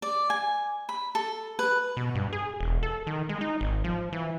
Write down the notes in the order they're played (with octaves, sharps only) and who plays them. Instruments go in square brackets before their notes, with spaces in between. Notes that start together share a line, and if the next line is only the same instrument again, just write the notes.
[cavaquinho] D5
G#5
B5
A4
B4
[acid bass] B2
G2
G#4
E1
A4
D#3
G#3
D#4
G#1
F3
E3